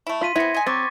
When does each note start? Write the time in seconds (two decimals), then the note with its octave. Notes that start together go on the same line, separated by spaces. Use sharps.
0.07 A3 E4
0.21 F4 C6 B6 D#7
0.36 B3 C4 E4 G#6 A#6 C#7
0.54 D#5 G#5
0.66 F#3 C4 C#6 D6 A6